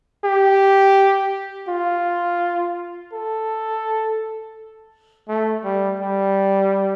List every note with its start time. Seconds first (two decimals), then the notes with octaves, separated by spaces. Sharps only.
0.24 G4
1.68 F4
3.13 A4
5.29 A3
5.64 G3
6.00 G3